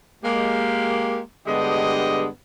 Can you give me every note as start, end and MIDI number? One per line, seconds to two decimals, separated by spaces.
0.23 1.19 56
0.23 1.19 58
0.23 1.19 67
1.46 2.26 43
1.46 2.26 50
1.46 2.26 56
1.46 2.26 59
1.46 2.26 67
1.46 2.26 75